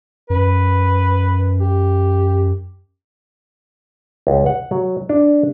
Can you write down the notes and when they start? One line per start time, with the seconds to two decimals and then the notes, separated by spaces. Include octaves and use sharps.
0.30 F#2 B4
1.60 G4
4.27 C#2
4.46 F#5
4.71 F#3
5.09 D4